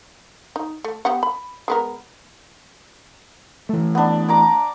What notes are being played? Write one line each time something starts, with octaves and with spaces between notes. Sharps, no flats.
D#4
A3
B3 G4 F#5
B5
G#3 B3 A#4
E3 A3
B3 D4
D5 A#5 D6